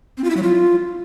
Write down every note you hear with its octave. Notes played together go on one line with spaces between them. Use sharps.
C4
F4
E4
F#3
F4